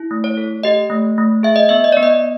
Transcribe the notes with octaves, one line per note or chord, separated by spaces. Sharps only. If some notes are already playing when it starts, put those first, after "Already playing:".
Already playing: E4
A3
C#5
A4
G4 D#5
A3
A3
G#4 E5
D#5
B3 E5
D#5
B3 D5
D#5